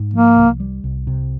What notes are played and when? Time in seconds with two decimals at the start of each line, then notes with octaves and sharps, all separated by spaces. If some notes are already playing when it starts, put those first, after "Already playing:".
Already playing: G#2
0.13 F3 A#3
0.37 C2
0.60 G3
0.84 C2
1.07 C3